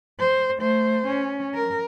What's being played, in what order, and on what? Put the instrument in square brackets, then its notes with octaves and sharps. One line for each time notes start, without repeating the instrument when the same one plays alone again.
[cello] C5
A3 C5
C#4
A#4